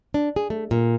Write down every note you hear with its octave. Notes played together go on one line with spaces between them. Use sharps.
D4
G#4
A3
A#2